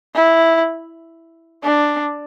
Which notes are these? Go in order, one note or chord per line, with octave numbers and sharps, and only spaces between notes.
E4
D4